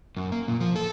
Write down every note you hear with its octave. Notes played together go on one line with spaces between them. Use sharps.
F#2
A#3
A#2
F3
A4